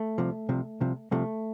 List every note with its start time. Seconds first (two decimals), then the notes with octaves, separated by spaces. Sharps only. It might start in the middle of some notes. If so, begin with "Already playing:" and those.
Already playing: A3
0.18 C2 C3 F3
0.49 C2 C3 F3
0.80 C2 C3 F3
1.11 C2 C3 F3 A3